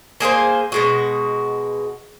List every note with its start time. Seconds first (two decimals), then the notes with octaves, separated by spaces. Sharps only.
0.20 A#3 G#4 A#4 C5
0.72 B2 G#3 F#4